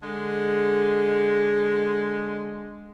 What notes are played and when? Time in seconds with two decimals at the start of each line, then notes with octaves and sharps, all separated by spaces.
0.03 D3 G#3